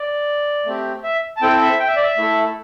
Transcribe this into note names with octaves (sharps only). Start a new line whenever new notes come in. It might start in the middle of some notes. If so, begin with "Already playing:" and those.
Already playing: D5
A3 C4 G4
E5
A5
C4 E4 A4 G5
E5
G5
E5
D5
E5
A3 E4 A4